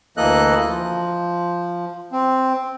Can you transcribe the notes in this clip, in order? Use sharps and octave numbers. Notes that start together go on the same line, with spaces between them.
D2 E3 A#3 A4 D#5 F#6
F3
C4